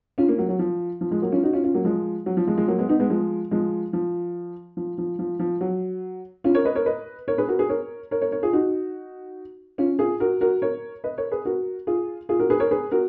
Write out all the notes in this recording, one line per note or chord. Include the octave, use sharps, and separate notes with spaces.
C#4 F4
A#3 C#4
F#3 A#3
F#3
F3
F3
F3 G#3
F#3 A#3
C#4 F4
D#4 F#4
C#4 F4
C#4 F4
F#3 A#3
F3 G#3
F#3
F3
F3 G#3
F3 G#3
F#3 A#3
G#3 B3
B3 D#4
G#3 B3
F3 G#3
F3 G#3
F3
F3
F3
F3
F3
F#3
C#4 F4
A#4 C#5
B4 D#5
A#4 C#5
B4 D#5
A#4 C#5
G#4 B4
F#4 A#4
G#4 B4
A#4 C#5
A#4 C#5
A#4 C#5
A#4 C#5
F4 G#4
D#4 F#4
C#4 F4
F4 G#4
F#4 A#4
F#4 A#4
A#4 C#5
B4 D#5
A#4 C#5
G#4 B4
F#4 A#4
F4 G#4
F4 G#4
F#4 A#4
G#4 B4
A#4 C#5
G#4 B4
F#4 A#4